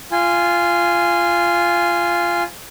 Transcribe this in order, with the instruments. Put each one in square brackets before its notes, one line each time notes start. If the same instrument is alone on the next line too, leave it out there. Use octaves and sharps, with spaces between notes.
[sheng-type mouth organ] F4 G#5